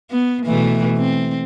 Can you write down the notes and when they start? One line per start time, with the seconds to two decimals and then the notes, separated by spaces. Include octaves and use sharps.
0.11 B3
0.46 B2 E3 A3
0.98 C4